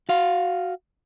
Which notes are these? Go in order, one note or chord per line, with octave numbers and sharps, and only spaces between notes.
F#4 F5